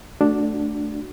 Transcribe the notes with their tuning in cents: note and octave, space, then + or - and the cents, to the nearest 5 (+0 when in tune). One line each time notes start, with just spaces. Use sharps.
A3 +0 D4 +0 F#4 +0